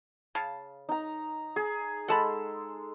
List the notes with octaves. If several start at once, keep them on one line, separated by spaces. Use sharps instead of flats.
C#3 F5 A5
D#4 A#5
G#4
G#3 A4 F#5 A5 B5